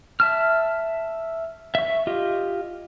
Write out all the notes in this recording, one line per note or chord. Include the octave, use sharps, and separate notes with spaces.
E5 A5 F6
E5 C#6
F4 G4 D#5